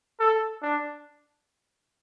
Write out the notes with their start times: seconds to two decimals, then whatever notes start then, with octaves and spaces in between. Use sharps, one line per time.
0.20 A4
0.63 D4